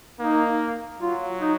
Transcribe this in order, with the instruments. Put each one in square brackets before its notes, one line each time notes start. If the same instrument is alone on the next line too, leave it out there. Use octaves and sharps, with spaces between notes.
[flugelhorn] A#3 [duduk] D#4
[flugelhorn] F#3 [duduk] F4
[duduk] D#4